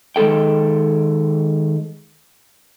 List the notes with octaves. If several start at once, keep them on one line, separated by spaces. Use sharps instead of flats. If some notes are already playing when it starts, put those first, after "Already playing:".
D#3 G#3 C4 A4 G5